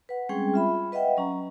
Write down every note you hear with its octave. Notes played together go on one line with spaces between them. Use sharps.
B4 F#5
G3 G#3 C4 C#4 G#4 G5
F4 E5 B5
B4 D#5 E5 F#5 G5
F#3 C#4 A#5